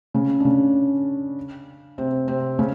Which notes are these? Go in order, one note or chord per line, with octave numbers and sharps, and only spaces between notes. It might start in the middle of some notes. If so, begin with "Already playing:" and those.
C#3 C#4
D4
C#3 C#4
C3 C4
C3 C4
C#3 C#4